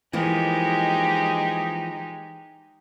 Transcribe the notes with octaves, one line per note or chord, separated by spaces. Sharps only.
E3 F3 G#3 A#3 D#4 G4